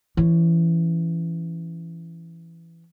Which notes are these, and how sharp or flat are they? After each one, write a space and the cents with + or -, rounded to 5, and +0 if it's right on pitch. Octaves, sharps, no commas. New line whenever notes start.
E3 +15 C#4 +0